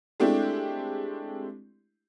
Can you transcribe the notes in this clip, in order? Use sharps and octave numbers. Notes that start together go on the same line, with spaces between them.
G#3 A3 C4 D4 E4 G4